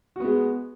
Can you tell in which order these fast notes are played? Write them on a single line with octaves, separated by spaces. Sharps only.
F#4 B3 G#3